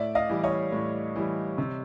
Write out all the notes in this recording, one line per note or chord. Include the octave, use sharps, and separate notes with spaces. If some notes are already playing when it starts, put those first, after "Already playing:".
Already playing: A2 D5 E5
D#5 F5
E3 G3
C#5 D#5
A2
E3 G3
C3